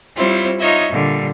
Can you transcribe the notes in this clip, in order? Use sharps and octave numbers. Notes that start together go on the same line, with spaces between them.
G3 C4 E4 F4 C5 C#5
D#4 F4 C#5 D#5 E5
A#2 D3 G3